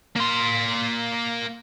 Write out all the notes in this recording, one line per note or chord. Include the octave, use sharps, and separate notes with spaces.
A#3 C6